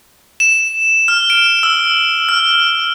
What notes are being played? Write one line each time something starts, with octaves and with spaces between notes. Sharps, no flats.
E7
F6
D7
E6
F6